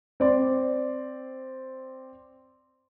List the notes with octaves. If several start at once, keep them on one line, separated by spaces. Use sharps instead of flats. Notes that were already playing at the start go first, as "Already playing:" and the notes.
C4 D5 C6